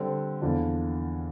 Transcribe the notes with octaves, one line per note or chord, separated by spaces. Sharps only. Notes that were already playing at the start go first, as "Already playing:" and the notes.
Already playing: D3 G3 C4
E2 D3 F3 A#3 D4